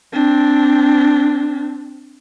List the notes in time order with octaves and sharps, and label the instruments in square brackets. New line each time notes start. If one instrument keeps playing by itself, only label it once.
[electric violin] C4 D4